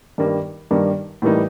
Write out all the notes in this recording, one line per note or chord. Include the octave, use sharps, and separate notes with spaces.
G2 D#3 G3 A#3
G2 D#3 G3 A#3
A2 E3 G3 A#3 D#4